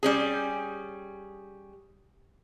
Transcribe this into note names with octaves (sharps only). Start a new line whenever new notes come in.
G3 C#4 G#4